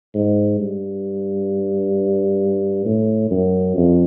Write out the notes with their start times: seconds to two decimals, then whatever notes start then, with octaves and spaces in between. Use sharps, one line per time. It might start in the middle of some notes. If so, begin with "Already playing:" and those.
0.14 G#2
0.59 G2
2.85 A2
3.31 F#2
3.76 F2